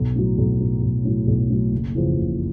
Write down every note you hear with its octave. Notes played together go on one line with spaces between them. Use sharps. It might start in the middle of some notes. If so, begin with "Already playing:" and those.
Already playing: B1
A2 F#3
B1
A2 F#3
B1
A2 F#3
B1
A2 F#3
F#1
F2 C#3 E3
F#1